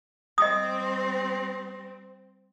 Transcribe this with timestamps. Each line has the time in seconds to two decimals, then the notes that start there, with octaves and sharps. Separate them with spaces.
0.38 G3 C4 D#5 D#6